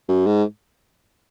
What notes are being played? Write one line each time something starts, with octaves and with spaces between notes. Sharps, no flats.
F#2
G#2